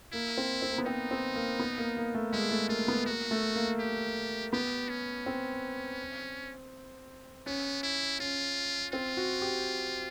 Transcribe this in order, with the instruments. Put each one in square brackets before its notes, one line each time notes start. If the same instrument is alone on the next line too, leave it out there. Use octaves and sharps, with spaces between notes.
[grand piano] A#3 [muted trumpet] E4
[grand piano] C4
C4
A#3
B3
[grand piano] C4 [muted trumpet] D#4
[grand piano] C4
A#3
B3
A#3
A#3
A3
[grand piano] G#3 [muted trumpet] E4
[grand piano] A3
[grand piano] A#3 [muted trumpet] F4
[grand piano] B3
[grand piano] A#3 [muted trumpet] F#4
[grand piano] A3
A#3
[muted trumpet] G4
[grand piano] B3 [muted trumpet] G4
[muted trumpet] C#4
[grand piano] C4
[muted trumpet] B3 [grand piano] C#4
[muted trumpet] E4
[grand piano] C#4 [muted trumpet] F4
[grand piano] C4 [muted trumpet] F4
[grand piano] F#4
G4